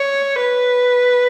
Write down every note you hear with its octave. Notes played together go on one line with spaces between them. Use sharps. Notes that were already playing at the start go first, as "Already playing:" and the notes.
Already playing: C#5
B4